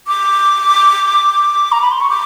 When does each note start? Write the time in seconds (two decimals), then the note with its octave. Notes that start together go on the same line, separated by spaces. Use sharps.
0.07 D6
1.71 A#5
1.81 B5
1.91 C6
2.00 C#6
2.09 D6